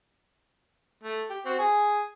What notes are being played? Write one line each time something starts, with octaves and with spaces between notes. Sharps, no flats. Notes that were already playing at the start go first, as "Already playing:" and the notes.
A3
G4
C4 F#4
G#4 G#5